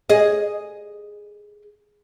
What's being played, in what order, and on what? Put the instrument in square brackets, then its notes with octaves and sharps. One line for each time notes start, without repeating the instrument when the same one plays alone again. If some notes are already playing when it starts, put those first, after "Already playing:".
[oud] G#4 D#5